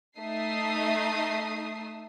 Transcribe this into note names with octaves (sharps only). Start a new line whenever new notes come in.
A3 D#4 E5 D#6 C7